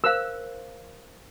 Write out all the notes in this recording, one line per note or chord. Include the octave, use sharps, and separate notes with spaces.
A#4 C5 F5 E6